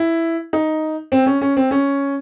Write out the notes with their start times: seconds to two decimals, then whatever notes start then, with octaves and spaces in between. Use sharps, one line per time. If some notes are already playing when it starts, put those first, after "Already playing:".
Already playing: E4
0.53 D#4
1.12 C4
1.26 C#4
1.42 C#4
1.57 C4
1.71 C#4